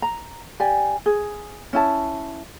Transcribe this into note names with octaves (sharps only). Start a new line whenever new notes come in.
A#5
G4 D5 G#5
G#4
C#4 E4 A5